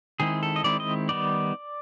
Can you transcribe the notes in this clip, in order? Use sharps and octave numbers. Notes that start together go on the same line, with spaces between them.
D#3 G#3 C4 E4 G#4
A4
D#5
D#3 G#3 C4 E4 D5
D#5
D#3 G3 B3 D#4 D5